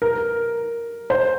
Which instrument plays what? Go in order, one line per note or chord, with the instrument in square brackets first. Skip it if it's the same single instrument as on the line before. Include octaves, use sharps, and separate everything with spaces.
[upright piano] A#4
C5